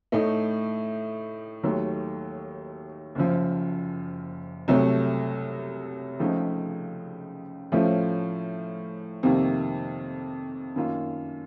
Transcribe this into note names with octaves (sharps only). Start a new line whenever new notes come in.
A2 A3 D#4
D#2 D#3 F#3 A3
F#1 F#2 F3
C2 C3 F#3 A3
C#2 C#3 F3 A3 D#4
A2 F3 A3 C#4 F4
F2 C3 D#3 A#3
F#2 D#3 A#3 F4